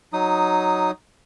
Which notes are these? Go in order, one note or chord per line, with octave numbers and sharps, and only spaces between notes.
F#3 D#4 D#6